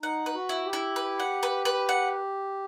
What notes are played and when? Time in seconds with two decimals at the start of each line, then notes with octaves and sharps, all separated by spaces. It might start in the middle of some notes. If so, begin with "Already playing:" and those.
0.03 D#4 F#5
0.26 B4
0.34 F#4
0.49 E4
0.65 G4
0.73 E4
0.96 B4
1.20 F#5
1.43 B4
1.65 B4
1.89 F#5